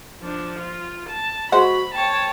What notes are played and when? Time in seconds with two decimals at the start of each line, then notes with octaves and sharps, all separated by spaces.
0.21 F3 D4
0.59 F4
1.10 A5
1.52 G#3 F#4 C5 F#5 B5
1.95 C#5 G5 A5